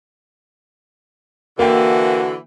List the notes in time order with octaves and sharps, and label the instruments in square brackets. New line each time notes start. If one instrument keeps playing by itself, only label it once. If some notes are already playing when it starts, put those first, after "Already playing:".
[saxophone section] D3 E3 [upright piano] A#3 G5 [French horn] F#4